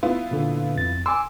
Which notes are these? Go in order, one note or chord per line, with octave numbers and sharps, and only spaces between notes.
B3 E4 F4
A#2 D3
F2 A6
G#5 C6 D6 E6